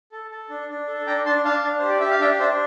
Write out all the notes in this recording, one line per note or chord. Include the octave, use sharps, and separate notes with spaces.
A4
A4
D4
D4
A4
D4 G5 A#5
D4 A5 C6
D4 F5 A5
D4
G4 C5
D5
G4 E5
F5
D4 E5 G5
D4 C5 E5